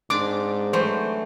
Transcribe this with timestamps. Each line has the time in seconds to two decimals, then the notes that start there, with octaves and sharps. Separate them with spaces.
0.10 G#2 C4 D4 D6
0.73 E3 F#3 A3 C5